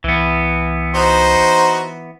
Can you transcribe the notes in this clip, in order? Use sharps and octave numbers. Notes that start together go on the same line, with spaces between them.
C2 E3 B3
D#4 F#4 C5